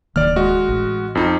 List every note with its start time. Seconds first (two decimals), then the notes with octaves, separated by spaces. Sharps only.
0.16 D1 D#3 A#3 D5 F6
0.36 G#3 F#4 D#5
0.69 A1
1.15 F2 D#4